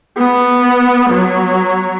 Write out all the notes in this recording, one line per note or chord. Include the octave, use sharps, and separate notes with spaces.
B3
F#3